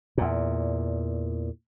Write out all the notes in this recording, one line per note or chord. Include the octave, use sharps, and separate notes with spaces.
E2 A#2